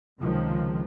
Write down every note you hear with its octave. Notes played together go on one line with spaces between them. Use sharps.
C#2 C3 D#3 F3 G#3